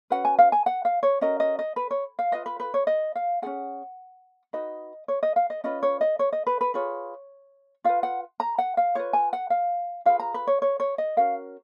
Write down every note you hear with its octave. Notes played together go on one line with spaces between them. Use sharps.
C#4 F#4 B4 F#5
G#5
F5
G#5
F#5
F5
C#5
C#4 F#4 A#4 D#5
D#5
D#5
B4
C#5
F5
F4 B4 D#5
B4
B4
C#5
D#5
F5
C#4 F4 G#4 F#5
D#4 F#4 B4 D#5
C#5
D#5
F5
D#5
C#4 F4 B4 D#5
C#5
D#5
C#5
D#5
B4
B4
F4 G#4 B4 C#5
F4 B4 F5
F#5
A#5
F#5
F5
F4 B4 C#5
G#5
F#5
F5
F4 G#4 B4 F5
A#5
B4
C#5
C#5
C#5
D#5
C#4 F#4 A#4 F5